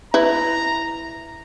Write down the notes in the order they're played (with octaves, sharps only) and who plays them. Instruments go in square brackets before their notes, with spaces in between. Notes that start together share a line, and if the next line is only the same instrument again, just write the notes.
[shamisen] E4 B4 [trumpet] A#5